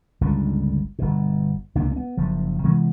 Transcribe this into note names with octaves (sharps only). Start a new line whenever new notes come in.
G1 C#2 D3
G1 B2
C#2 C3 A#3 D4
B3 C#4
F#1 F3
C3 E3 G#3 B3